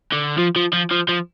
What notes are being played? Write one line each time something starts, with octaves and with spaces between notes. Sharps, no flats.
D3
F3
F3
F3
F3
F3